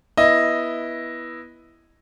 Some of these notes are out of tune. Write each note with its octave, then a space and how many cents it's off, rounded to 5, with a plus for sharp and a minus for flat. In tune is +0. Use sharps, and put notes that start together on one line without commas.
B3 -15 E4 +0 D#5 +0